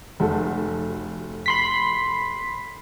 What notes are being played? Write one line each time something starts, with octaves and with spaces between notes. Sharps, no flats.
F1 F#4 A4
B5 C6 B6